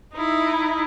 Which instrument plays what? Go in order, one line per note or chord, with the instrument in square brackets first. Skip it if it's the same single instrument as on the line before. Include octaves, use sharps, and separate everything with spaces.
[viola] D#4 E4